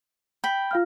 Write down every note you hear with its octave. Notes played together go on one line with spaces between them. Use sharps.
G5 B5
F4 F5 F6